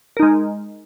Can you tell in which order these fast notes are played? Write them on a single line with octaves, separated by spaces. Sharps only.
A#4 D#4 G#3